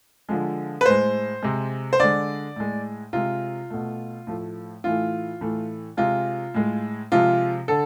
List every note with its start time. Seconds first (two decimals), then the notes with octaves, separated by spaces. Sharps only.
0.29 D3 F3 G#3
0.81 B4
0.86 A2 G#3 C5
1.42 C3 G#3
1.93 C5
2.00 D3 G#3 D5
2.56 A2 G#3
3.13 C3 G#3 F4
3.70 B2 A3
4.27 A2 F3 A3
4.84 A2 E3 A3 F4
5.41 A2 E3 A3
5.97 C3 G#3 F4
6.54 A2 G#3
7.12 C3 F3 G#3 F4
7.68 D3 A4